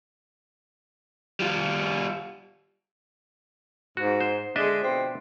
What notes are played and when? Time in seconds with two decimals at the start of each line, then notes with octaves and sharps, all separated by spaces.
1.40 G3 F4
3.97 G#2 F#4
4.21 C5
4.56 D3 G#3 D4 D#5 E5
4.80 B2 F3 C4